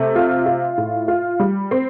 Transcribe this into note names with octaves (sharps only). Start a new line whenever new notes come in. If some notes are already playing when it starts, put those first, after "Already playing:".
Already playing: C3 A3
F4
F4
A2
F4
G3
C4